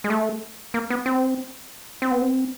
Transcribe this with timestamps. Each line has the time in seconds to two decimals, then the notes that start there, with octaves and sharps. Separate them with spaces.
0.04 G#3
0.10 A3
0.74 A#3
0.90 B3
1.06 C4
2.02 C4
2.11 B3
2.22 C4